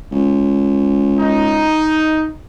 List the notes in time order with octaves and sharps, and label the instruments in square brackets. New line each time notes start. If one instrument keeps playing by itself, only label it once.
[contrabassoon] C#2
[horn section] D#4